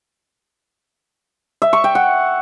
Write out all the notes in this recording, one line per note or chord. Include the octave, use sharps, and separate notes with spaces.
E5
C#6
G5
F#5